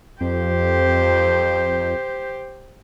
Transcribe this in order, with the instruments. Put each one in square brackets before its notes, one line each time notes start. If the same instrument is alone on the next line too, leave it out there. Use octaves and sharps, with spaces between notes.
[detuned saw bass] F2 [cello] G4 C5